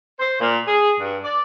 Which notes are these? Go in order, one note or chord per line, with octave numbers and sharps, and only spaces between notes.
C5
A#2
G#4
G2
D5